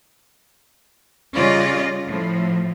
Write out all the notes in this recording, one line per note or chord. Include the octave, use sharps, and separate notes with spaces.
C#3 G3 C#4 F4 D5 D#5
A2 F3